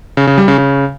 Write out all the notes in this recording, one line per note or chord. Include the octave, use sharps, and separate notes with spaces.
C#3
C#3
G3
C#3
C#3